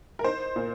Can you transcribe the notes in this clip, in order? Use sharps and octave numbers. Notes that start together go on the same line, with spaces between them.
A#4
D#4 C5
A#2